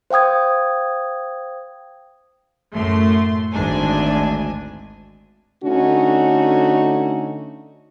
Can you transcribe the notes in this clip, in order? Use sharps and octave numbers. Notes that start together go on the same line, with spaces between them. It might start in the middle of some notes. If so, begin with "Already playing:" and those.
C5 F5 G5 D#6 G#6
F#2 A2 A3 C6
G#1 D2 G#2 D4 G#5
D3 A3 C#4 D#4 F#4